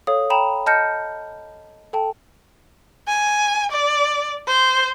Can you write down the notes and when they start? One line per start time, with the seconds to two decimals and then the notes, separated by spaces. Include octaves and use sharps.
0.07 A4 C#5 F5 D#6
0.30 G5 A#5 B5 E7 F7
0.66 D#5 A5 F6 G6 A#6 C#7
1.93 A4 G5 A5
3.08 G#5
3.72 D5
4.48 C5